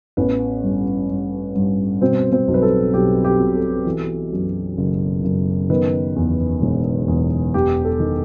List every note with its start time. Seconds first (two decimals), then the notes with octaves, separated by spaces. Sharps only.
0.17 A1 B3 B4
0.63 G2
1.10 G2
1.55 G2
2.01 B2 C4 C5
2.32 C4 C5
2.48 B1
2.54 B4
2.62 A4
2.93 B1 G4
3.24 G4
3.40 B2
3.55 A4
3.86 E3
4.32 F#2
4.77 F#1
5.24 F#1
5.70 D#3 B3 B4
6.16 E2
6.62 E1
7.08 E2
7.54 E1 G4
7.85 A4
8.00 D#3